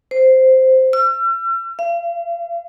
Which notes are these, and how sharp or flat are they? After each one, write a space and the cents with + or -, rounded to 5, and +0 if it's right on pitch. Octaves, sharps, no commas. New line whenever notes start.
C5 -5
E6 +45
F5 -40